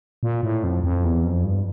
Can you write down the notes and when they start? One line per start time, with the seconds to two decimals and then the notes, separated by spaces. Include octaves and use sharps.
0.23 A#2
0.43 A2
0.64 F2
0.84 F2
1.04 E2
1.25 F2
1.44 G2